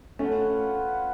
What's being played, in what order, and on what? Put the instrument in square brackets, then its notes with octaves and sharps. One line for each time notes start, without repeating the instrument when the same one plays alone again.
[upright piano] A3 C#4 [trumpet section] F4 B4 F#5